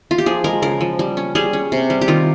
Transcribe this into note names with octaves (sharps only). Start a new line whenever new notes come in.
F4
G4
F3 G#4
G#3 A#4
C#3 A#4
F3
G3
C#4
G3 G#4
C#4
C3
G3
G4
D#3 F4